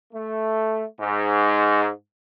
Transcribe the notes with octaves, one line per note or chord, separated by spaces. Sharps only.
A3
G#2